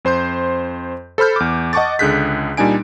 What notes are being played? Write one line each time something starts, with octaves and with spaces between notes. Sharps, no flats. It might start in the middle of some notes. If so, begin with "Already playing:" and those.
F2 C5 C6 G6
A4 C5 B5 F6 G6
E2 D6
D#5 F#5 A5 C#6 D6 A6
C#2 D3 G#4 F#6 G6 B6
A#2 G3 D4 D#4 G#5 D7